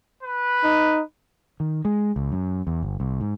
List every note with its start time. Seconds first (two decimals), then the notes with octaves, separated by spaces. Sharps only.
0.23 B4
0.64 D#4
1.60 D#3
1.85 G#3
2.16 C#2
2.32 F#2
2.67 E2
2.83 G1
3.00 C2
3.21 G#2